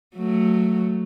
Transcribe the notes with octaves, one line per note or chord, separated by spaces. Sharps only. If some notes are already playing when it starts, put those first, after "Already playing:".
F#3 A3